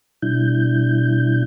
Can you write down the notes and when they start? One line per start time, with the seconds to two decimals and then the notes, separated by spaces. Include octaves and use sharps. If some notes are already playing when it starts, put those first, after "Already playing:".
0.22 B2 G3 D4 E4 G6